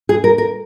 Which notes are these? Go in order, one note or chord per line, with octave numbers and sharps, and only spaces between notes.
G#4
A#4
A#4